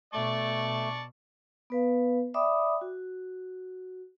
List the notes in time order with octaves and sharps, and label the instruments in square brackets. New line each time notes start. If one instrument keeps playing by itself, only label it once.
[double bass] B2 [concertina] A3 [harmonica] D5 A5 C#6
[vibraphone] B3 B4 F5
D5 E5 G5 B5 D6 D#6
F#4